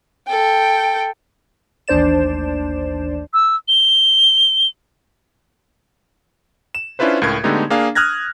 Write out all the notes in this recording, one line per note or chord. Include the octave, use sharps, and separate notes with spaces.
A4 G5
A1 D#2 D4 C5 D5 E7
E6
G7
E7
C#4 D4 E4 F4 B4 C5
C#2 A2 A#4 G#6
D3 G#3 A3 B3 D#4 G4
A#3 D4 G#4 F5
D#6 F6 F#6 G#6 A#6